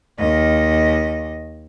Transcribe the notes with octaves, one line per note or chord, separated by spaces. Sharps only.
D#2 D#5